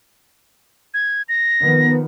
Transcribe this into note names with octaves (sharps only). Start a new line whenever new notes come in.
G#6
A#6
D#3 F3 B3